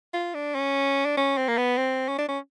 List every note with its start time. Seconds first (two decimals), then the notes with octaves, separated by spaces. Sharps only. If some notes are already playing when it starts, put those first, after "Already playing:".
0.14 F4
0.34 D4
0.55 C#4
1.05 D4
1.17 C#4
1.37 C4
1.48 A#3
1.57 B3
1.78 C4
2.08 C#4
2.19 D4
2.28 C#4